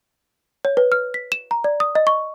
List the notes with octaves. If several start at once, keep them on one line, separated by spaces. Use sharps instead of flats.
C#5
B4
F6
B6
E7
A#5
D5
D#6
D#5
C#6